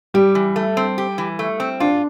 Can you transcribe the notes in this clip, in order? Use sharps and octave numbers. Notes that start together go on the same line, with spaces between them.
G3 G4
E3
A3
C4
G4
E3
A3
C4
D4 F4